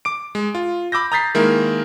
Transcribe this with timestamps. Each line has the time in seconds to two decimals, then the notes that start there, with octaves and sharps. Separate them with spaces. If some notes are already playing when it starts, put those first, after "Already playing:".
0.05 D6 D7
0.35 G#3
0.55 F4
0.92 B5 D6 E6 G6 A#6
1.12 A#5 D#6 G6 A6 B6 C7
1.35 D#3 G#3 A#3 E4 A#4